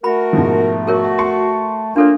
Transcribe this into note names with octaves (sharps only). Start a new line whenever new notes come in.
A3 F#4 A#4 B5
G#2 B2 F3
F#4 G#4 A#4 C#5
A5 C6 C#6
A#3 D4 F4 A4 C#5